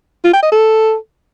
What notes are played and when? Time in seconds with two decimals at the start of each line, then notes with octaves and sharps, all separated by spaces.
0.24 F4
0.33 G5
0.42 D#5
0.52 A4